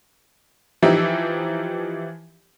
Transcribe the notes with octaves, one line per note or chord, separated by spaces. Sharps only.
E3 F3 D#4 G4 E5